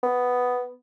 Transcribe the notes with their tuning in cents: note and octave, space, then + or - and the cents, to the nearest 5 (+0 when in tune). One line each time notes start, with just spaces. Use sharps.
B3 +5